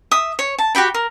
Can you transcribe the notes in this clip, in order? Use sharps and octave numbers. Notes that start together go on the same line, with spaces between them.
E5 D#6
C#5
A5
F#4 G4 G5 B5
A#4